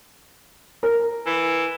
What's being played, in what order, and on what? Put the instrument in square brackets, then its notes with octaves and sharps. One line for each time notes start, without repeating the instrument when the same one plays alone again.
[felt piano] A#4
[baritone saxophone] E3